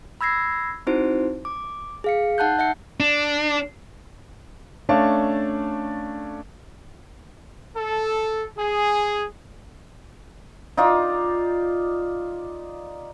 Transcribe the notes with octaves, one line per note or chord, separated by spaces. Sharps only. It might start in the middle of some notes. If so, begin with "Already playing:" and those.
B5 E6 G#6 A#6 C7
C4 D#4 E4 F#4 C5
D6
G#4 F5 C#7
D#4 F#5 A5 F#6 G6
E5 F#5 C#7
D4
A3 C#4 D4 D5 F5 A5
A4
G#4
D#4 F4 D5